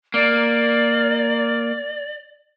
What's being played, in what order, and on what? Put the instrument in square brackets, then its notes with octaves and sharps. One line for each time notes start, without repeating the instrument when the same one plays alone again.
[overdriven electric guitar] A#3 [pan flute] D5